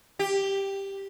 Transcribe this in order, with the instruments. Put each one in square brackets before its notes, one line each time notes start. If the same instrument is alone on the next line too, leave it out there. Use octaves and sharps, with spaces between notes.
[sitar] G4